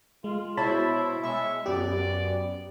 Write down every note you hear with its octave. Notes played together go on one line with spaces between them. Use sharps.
G#3 F4
B2 E4 C5 C#5 E5 A5 B5
G#3 E5 C#6
F#2 B3 G4 D5